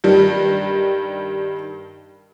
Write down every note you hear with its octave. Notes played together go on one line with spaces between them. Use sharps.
G2 D#3 G3